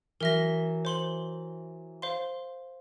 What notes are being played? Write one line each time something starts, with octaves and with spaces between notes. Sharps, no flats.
E3 F#3 A#4 E5 A#6
C5 C6 F#7
C5 F5 C6